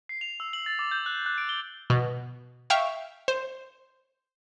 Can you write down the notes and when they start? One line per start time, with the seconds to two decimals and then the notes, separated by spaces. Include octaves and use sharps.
0.09 C7
0.21 F7
0.40 E6
0.53 F#7
0.66 A6
0.79 D6
0.91 G6
1.06 F#6
1.26 F#6
1.38 D7
1.49 G7
1.90 B2
2.70 E5 F5 G5 C#6
3.28 C5